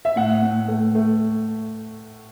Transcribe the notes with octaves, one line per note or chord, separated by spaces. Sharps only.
E5
A2 F#5
A2
A3
A3